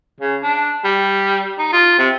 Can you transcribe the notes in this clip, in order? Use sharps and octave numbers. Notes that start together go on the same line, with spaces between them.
C#3
D4
G3
D#4
F4
C3